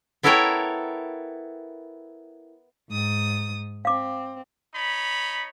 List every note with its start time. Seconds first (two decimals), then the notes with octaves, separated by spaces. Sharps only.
0.23 B3 E4 A4 A#4 C#5 G5
2.89 G#2 D#6
3.85 C4 F5 D6
4.74 D#4 C#5 B5